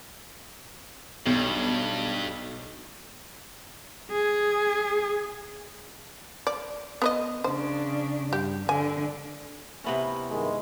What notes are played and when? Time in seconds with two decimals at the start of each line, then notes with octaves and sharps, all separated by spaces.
1.26 B1 G2
4.12 G#4
6.47 D5
7.02 B3 B4 D#5
7.44 C#3 D4 C5
8.33 G2 G4
8.69 D3 G#5
9.84 C3 B3 C#4 E4
10.30 G2 D#3 G#3 E4